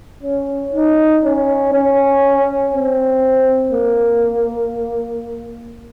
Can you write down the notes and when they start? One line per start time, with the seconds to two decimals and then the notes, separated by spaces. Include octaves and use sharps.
0.23 C#4
0.73 D#4
1.23 C#4
1.72 C#4
2.73 C4
3.72 A#3